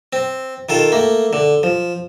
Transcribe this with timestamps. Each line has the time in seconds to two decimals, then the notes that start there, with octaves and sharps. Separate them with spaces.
0.13 C4
0.69 D#3 F4 A4
0.92 A3 A#3
1.33 D3
1.63 F3